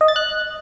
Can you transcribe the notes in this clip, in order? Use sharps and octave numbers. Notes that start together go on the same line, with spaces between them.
D#5
A6
F#6